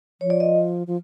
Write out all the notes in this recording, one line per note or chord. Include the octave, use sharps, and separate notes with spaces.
F3 C#5
D5
D#5
F3